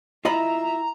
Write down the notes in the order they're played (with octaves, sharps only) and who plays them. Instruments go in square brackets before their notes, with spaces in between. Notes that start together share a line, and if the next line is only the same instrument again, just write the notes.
[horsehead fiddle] E4 E5 [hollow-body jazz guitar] F4 D#5 B5 [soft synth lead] A#5